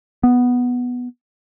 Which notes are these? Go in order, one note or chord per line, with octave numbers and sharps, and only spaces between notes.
B3